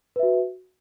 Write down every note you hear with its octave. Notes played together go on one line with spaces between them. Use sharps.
F#4 B4 E5